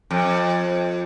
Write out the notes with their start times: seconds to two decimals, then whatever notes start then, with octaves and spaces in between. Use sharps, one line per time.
0.11 F2